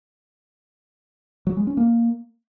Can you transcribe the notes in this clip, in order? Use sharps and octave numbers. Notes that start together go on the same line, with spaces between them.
F#3
G#3
C#4
A#3